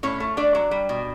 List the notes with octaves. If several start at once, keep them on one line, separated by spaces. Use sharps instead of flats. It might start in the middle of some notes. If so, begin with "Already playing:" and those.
A2 C#4 C#5
A3
A3 D4 D5
F#3
G3
B2